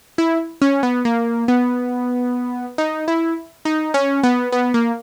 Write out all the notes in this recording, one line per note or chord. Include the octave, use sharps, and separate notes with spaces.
E4
C#4
B3
A#3
B3
D#4
E4
D#4
C#4
B3
B3
A#3